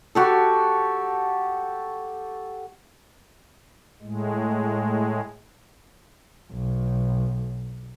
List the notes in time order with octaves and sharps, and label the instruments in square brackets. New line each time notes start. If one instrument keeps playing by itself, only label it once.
[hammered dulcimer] F#4 G4 A4
[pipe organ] A2 G#3
[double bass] B1